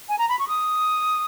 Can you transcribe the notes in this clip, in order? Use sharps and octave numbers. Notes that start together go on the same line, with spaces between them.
G#5
A#5
B5
C#6
D#6